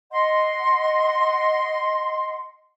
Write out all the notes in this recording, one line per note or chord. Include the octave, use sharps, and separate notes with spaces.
D#5 F#5 C6